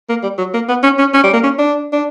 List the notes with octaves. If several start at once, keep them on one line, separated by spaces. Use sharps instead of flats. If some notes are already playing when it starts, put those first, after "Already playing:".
A#3
G3
F#3
A#3
B3
C#4
C#4
C#4
G3
A#3
C#4
D4
D4